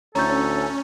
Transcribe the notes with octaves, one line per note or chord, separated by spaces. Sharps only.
D2 A2 C#4 A4 A#5 C#6 G6